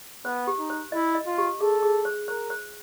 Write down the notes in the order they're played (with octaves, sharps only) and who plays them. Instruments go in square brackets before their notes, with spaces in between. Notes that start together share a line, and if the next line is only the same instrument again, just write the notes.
[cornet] B3 [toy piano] C5
[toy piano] G4
[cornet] D#4
[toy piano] C5
[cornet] E4 [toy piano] D#5
[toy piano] D#5
[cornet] F4
[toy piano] G4
[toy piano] G#4 [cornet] A4
[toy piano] G#4
C5
[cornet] A#4 [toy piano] C5
[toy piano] C5